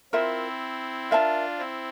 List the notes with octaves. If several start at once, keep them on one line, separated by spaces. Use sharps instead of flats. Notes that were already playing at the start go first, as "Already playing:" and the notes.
C4 E4 F4 A#4 E5
D4 F4 A#4 E5 A5
C4 E4